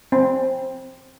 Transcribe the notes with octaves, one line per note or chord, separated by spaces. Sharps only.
C4